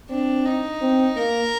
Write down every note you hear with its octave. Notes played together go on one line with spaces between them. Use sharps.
C4 D4
D#4
C4
A#3 A#4